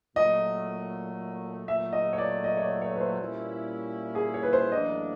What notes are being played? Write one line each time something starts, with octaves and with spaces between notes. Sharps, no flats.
A#2 F#3 A3 D#5
A#2 F#3 A3 E5
D#5
C#5
D5
D#5
C#5
D5
C#5
B4
C5
A#2 G3 A#3 C#4 E4
G#4
C#5
B4
C5
A1 A2 F#3 A#3 D4 D#5